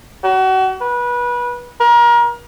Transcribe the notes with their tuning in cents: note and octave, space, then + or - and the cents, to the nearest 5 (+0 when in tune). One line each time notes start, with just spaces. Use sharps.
F#4 +35
B4 -25
A#4 +30